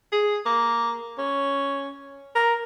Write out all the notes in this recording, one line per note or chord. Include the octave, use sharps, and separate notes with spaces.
G#4
A#3
C#4
A#4